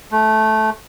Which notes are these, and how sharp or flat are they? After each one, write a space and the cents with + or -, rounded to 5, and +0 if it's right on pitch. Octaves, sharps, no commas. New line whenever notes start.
A3 -15